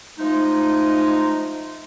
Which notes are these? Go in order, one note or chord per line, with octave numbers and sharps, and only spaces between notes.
F3 G#3 A3 D#4